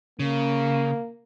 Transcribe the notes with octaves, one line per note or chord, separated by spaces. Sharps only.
C#3 A#3